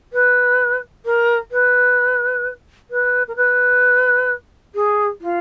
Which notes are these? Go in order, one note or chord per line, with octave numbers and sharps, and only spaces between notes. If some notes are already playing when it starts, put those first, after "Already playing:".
B4
A#4
B4
B4
A#4
B4
G#4
F4